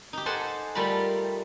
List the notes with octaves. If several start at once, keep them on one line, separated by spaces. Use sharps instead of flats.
D#4 G4
A4 C5 F#5 G#5
G3 A3 F4 A#4 B5